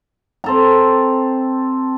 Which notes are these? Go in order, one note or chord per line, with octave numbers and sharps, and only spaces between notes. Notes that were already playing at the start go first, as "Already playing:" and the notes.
C4 A4 A#5